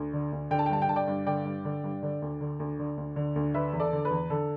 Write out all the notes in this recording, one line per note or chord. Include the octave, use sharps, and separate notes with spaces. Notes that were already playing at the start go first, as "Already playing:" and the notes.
Already playing: D2
D3
D2
D3 G5
A5
G5
G2 A5
G5
D3 A5
D5 G5
G2
D3 D5 G5
G2
D3
G2
D3
D2
D3
D2
D3
D2
D3
D2
D3 B4 E5
E2
A4 D5
D3
B4
E2
D3 A4